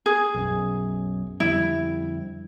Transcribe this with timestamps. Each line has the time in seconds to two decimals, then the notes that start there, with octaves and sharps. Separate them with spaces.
0.06 G#4
0.34 B1 F#2
1.40 F2 D3 G3 E4